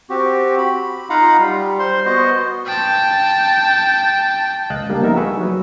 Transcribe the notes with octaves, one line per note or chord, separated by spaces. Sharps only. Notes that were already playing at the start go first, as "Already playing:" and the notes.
C4 F#4 G4
B5
D#4 F4 F5 F#5 A#5 B5
G3
C5 C6
B3 F#4 C5 D#5
G5 A5
C#2 D#5 F5 F#6
G3 A#3 D4
F3 B3 D#4 A#4 E5
G#4 B4 C#6 E6
F#3